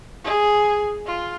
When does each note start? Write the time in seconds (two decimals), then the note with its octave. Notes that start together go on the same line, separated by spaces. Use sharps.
0.24 G#4
1.06 F4